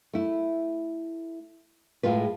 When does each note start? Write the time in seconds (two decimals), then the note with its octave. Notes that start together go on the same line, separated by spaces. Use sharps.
0.13 A3 E4
2.03 A2 G#3 F4 B4